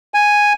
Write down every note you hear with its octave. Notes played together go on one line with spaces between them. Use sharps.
G#5